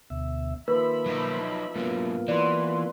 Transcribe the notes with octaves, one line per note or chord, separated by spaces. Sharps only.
D2 B2 E5
D#3 F3 A#3 B4 E5 B5
F#3 D#4
G#2 F#3 A#3 B3 F4
E3 F#3 B4 D5 C6